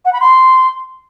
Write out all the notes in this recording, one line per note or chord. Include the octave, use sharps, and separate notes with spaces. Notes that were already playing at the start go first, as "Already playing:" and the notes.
F#5
B5
C6